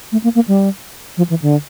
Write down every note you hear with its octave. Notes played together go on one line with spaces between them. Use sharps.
A3
A#3
A#3
G3
F3
E3
D3